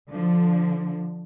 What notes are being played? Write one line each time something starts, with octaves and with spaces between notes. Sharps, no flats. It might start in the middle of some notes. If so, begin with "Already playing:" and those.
D3 F3